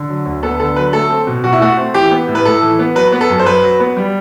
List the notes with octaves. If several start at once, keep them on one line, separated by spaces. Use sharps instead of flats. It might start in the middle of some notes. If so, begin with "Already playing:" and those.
Already playing: D3
F#3
D2
B3 A4
D3 A4
F#3 B4
A3 A4
C4
B2
B2 F#4
E4
A3 F#4
C4
E3 G4
B3
A2
B4
A2 A4
E3
B3
F#3 B4
B3
A4
F#2
C5
F#2 B4
F#3
B3
G3